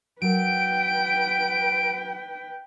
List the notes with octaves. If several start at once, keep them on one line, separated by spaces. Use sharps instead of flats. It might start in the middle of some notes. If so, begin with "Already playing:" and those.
F#3 A#4 B4 G5 D7